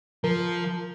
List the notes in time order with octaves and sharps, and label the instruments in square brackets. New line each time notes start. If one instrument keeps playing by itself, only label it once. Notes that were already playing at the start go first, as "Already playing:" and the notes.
[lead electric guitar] F3 [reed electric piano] A#4